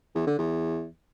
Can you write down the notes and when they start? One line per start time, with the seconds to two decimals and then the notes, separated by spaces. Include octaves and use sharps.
0.15 E2
0.27 D3
0.38 E2